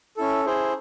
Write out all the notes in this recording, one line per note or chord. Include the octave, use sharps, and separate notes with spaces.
C#4 E4 A4
E4 G#4 C5